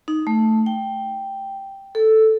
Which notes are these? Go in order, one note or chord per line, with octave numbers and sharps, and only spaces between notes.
D#4
A3
G5
A4